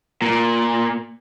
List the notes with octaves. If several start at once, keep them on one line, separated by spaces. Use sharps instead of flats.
A#2